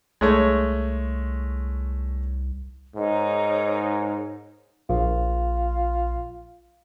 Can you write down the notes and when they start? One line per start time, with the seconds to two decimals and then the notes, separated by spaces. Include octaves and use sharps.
0.21 C2 G#3 A3 C#5
2.95 G#2 D#4 A#4 C#5
4.90 A#1 F4